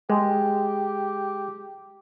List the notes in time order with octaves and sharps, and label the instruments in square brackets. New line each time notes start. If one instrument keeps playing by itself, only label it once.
[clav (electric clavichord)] G#3 [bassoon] G4